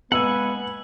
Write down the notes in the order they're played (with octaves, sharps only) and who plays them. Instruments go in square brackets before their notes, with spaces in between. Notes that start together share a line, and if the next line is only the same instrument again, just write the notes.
[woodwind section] G#3 A#3 B3 [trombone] B4 [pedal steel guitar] F#5 G#5 [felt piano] E6